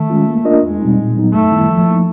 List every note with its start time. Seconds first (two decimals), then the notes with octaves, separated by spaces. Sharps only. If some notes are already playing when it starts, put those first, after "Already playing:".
Already playing: D#3 A3
0.10 G#3 C#4 F4
0.27 A#3
0.45 D4 F4 A#4 D#5
0.63 E2 G#3
0.80 B2 G3 C4 D#4
0.98 A#2
1.16 F#3 B3 D#4
1.34 F#2 A3
1.51 D#3 G3 B3 E4
1.69 F3
1.87 A#3 D#4